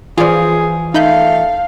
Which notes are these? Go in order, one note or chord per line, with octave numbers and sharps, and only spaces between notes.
E3 F3 F4 G#4 D5
A3 D#4 F5 B5 G6